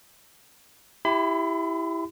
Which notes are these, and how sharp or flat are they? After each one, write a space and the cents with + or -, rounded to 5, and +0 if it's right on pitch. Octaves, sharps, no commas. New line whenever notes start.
E4 +0 G4 +0 B5 +45